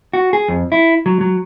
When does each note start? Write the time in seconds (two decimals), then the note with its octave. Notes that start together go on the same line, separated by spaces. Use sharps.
0.13 F#4
0.33 G#4
0.48 F2
0.72 E4
1.06 F#3
1.21 F#3